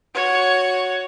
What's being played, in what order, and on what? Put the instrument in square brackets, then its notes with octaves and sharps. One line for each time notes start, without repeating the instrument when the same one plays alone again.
[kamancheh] F#4 C#5